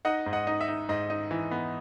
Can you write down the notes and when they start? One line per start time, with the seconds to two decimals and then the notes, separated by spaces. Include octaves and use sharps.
0.05 D#4 D#5 F#5
0.26 G#2
0.33 D#5 F#5
0.47 D#4
0.61 E5
0.68 D#4
0.89 G#2 D#5
1.10 D#4
1.31 E3
1.51 B3